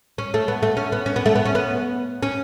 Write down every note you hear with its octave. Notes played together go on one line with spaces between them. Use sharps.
C#4
A3
B3
A3
C#4
B3
C#4
B3
A3
B3
C#4
B3
C#4